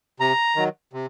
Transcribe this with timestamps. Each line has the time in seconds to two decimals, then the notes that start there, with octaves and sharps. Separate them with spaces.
0.20 C3 A#5
0.56 D#3 F#3
0.93 C3